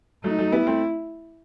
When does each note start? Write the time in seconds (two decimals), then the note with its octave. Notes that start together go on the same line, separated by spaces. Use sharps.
0.24 F#3 A3 D#4
0.39 F#3 A3
0.52 G3 B3 E4
0.67 A3 C4